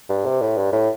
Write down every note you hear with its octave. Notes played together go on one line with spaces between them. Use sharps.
G2
C3
A2
G2
A2